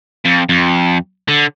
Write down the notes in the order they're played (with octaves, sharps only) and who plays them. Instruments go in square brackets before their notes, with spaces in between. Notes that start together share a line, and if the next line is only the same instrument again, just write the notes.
[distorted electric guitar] F2
F2
D3